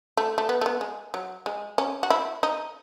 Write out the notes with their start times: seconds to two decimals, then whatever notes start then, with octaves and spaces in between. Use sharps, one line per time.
0.17 A3
0.38 A3
0.49 B3
0.61 A3
0.66 B3
0.81 G#3
1.14 F#3
1.46 G#3
1.78 C#4
2.03 F#4
2.10 E4
2.43 D#4